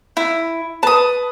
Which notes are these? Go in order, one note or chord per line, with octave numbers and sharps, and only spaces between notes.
E4
B4 A5 D#6